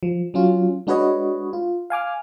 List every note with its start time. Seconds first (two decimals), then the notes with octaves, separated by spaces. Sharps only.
0.03 F3
0.34 F#3 C#4 F4
0.87 G#3 D4 F#4 B4 C#5 D#5
1.53 F4
1.90 F5 G#5 D6 F6